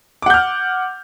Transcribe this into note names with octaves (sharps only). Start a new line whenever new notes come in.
F#5 D6 F6 G6